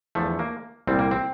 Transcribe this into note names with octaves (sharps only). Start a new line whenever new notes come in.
E2 D3 F3 A3
A#3
C2 A#2 G3 C4
A#3
C4